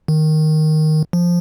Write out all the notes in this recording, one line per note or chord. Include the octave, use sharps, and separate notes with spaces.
D#3
F3